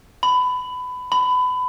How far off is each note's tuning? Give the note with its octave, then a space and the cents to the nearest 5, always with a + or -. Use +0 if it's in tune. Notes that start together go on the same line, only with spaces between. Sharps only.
B5 +20
B5 +25